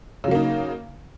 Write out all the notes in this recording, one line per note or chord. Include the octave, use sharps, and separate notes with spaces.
C#3 F#3 A#3 D#4